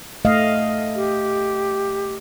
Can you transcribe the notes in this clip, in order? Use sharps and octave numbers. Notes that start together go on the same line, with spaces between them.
A3 D#5 F5
G4